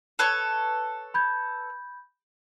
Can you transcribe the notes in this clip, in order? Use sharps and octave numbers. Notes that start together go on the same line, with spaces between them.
A4 B4 C#5
B5 G6 G#6